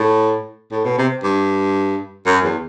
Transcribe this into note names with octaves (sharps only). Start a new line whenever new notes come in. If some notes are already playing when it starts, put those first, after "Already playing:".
Already playing: A2
A2
B2
C3
G2
F#2
E2